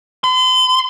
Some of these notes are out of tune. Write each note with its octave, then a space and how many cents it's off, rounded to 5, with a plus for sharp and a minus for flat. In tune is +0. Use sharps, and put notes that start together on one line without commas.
C6 -45